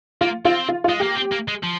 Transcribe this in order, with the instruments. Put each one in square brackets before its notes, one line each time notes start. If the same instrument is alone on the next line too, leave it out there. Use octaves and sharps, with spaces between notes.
[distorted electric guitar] A#3 [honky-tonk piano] F4
[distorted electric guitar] C4 [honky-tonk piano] F4
[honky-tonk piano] F4
F4
[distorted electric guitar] G#3
[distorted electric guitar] A#3 [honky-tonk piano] G4
[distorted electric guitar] C4
A#3
G#3
F3